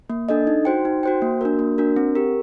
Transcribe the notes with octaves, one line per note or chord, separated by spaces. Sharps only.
A#3
D4 A4 D#5
D#4
F#4 C5 G5
D#4
F#4 C5 G5
A#3
D4 F#4 A#4
A#3
D4 F#4 A#4
C4
G4 A#4